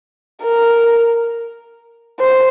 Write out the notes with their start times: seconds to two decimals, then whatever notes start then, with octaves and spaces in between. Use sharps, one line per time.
0.43 A#4
2.20 C5